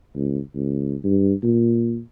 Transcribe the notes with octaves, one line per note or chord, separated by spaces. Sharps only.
C#2
C#2
G2
A#2